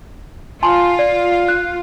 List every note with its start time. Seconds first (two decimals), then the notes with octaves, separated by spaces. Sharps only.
0.63 F4 G#5 A5 C6
0.99 D5
1.48 F#6